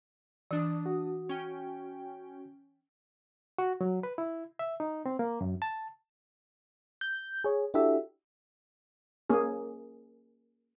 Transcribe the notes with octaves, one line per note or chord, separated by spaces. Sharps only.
E3 D4 D#6
F#4
C#4 G5
F#4
F#3
B4
E4
E5
D#4
C4
A#3
F#2
A5
G6
G#4 C#5
D4 E4 F#4 G4 A4 E5
A#3 C#4 G#4